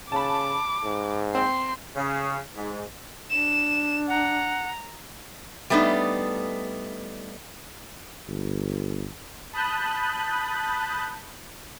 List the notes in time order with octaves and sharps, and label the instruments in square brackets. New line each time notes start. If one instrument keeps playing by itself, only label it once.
[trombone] C#3 [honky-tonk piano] A5 B5 [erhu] D6
[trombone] G#2
[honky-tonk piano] C4 [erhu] C6
[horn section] C#3
G#2
[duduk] D4 [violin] E7
[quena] F#5 [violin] A#5
[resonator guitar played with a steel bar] G3 A3 B3 D4 D#4
[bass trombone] G1
[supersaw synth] A5 B5 D#6 F#6 G6